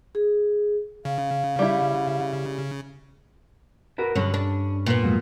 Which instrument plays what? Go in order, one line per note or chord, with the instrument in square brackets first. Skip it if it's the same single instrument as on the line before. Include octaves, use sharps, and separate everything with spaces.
[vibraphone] G#4
[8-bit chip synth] C#3 [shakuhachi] F5
[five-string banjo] G3 E4
[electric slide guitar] F#4 A#4 B4
[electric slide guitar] G2 C#4 [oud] D3 F#3
[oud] D4
A#2 B3
[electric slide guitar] F2 G#2 F#3